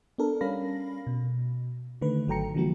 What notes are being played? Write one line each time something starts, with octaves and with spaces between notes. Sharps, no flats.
B3 D4 A4 A#4
G3 C#4 A#4 F5 B5 A#6
B2
D3 D#3 A3 B4
G#1 F#3 A4 G5 A#5 C#7
D3 E3 F3 G3 A#3 F#4